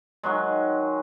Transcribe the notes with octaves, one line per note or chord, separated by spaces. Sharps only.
D#3 F#3 G#3